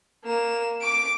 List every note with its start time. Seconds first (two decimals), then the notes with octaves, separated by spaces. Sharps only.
0.24 A#3 E7
0.81 D6 D7